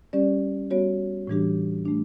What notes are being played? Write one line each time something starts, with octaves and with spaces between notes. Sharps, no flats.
G3 C#4 G4 D5
G3 B3 F#4 C#5
A2 E3 G3 D4 G4
A3 D4